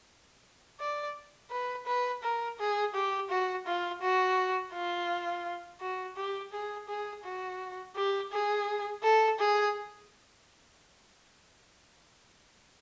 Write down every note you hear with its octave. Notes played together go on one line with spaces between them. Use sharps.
D5
B4
B4
A#4
G#4
G4
F#4
F4
F#4
F4
F#4
G4
G#4
G#4
F#4
G4
G#4
A4
G#4